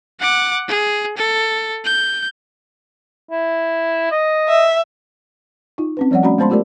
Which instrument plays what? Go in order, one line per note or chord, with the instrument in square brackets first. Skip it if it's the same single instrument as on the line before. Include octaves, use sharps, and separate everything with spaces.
[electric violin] F#5 D6
G#4
A4
G6
[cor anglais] E4
D#5
[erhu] E5
[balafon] D#4 F4
C4 C#4 B4
F3 G3 C#5 D5 F#5
A3 C#4 F#4 D5 A#5 B5
G#3 B3 C5 A5 B5 C6
A3 F4 G4 A#4 D5